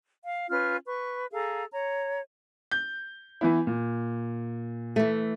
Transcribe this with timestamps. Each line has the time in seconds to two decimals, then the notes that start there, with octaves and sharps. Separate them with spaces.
0.24 F5
0.50 C#4 F4 B4 F6
0.85 B4 C#6
1.32 G#4 A4 F5 A#5
1.72 C#5 A#5
2.71 G6
3.41 E3 B3 E4
3.67 A#2
4.96 E3 A3